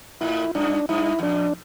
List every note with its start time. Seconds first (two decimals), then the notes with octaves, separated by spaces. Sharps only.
0.21 A2 E4
0.55 G2 D4
0.89 G2 E4
1.19 E2
1.23 F2 D4